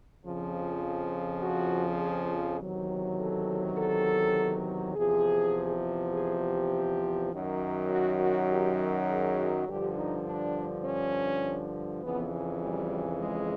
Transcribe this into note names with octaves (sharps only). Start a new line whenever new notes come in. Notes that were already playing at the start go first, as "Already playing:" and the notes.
F2 C#3 F3
F#4
G#4
E2 C3 D#3 F#3
A4
A4
E2 C3 F3 G#4
G#4
G4
F#2 D#3 F#3
F#4
F#4
G4
G#4
G2 D3 F3 G4
D#4
D4
C#4
F2 C#3 E3 B3
G3
G#3